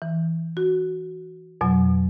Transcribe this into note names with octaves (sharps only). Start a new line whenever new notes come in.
E3
F#4
F2 B2 F#3